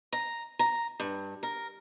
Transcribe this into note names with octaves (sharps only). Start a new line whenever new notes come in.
A#5
A#5
G2
A#4